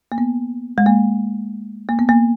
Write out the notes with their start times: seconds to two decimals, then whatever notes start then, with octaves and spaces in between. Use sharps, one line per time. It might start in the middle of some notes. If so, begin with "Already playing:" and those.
0.12 A#3
0.18 B3
0.78 G#3
0.86 A#3
1.89 A#3
1.99 B3
2.09 A#3